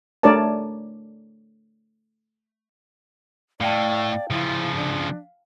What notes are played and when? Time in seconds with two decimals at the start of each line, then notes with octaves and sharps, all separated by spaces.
0.23 A3 D4 A#4 C#5 D5 A5
3.60 A2 D5 F5 G5 A5
4.30 C#3 F3 E4
4.75 D4